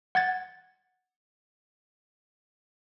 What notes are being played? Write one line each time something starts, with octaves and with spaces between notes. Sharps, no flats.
F#5 G#6 A6